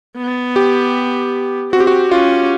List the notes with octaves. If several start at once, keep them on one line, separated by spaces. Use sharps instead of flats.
B3
G4
C4 F#4
G4
F#4
C#4 F4